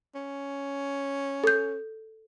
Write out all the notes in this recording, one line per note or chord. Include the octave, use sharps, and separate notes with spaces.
C#4
A4 G6